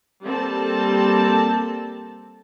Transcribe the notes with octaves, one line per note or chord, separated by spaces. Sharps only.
G3 A#3 C4 A4 A5